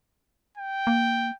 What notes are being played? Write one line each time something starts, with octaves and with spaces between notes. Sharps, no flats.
G5
A#3